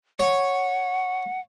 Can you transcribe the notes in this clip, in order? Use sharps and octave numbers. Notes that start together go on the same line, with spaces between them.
C#5 F#5